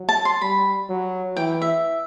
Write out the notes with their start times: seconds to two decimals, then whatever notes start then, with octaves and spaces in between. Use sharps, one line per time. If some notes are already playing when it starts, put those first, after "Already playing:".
Already playing: F#3
0.09 A5
0.25 C6
0.41 G3 B5
0.89 F#3
1.37 E3 G5
1.62 E5